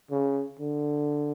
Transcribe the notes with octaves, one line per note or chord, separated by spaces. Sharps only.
C#3
D3